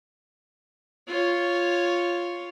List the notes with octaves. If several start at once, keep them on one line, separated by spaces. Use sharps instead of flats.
F4 C#5